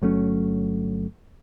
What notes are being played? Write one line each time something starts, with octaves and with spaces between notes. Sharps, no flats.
G1 F#3 A3 C#4